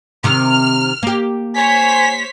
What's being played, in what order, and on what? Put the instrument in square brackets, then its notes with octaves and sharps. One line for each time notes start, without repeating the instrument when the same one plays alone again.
[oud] C3 D#3 [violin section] F6
[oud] A#3 G4
[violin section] C5 C#5 B6 [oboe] G#5